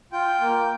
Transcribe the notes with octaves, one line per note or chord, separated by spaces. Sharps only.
F4 G5
A#3